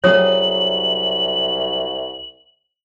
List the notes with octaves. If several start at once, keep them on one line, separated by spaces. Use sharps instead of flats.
C2 F#3 G#4 C#5 D#6 F#7